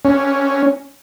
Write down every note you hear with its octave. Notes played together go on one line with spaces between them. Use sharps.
C#4